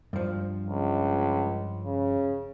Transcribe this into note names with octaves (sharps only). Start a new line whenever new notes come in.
G2 F3
C#2
C#3